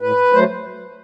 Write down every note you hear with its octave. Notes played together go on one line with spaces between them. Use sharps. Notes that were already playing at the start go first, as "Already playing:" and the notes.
A2 B4
F#3 A3 C5